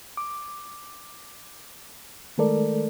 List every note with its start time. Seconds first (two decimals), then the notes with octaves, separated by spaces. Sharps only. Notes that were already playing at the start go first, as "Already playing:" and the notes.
0.17 D6
2.38 D#3 G#3 A3 A4 A#4 D5